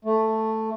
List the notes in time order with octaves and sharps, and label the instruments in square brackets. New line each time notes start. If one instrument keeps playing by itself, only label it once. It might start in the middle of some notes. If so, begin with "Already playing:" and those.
[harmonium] A3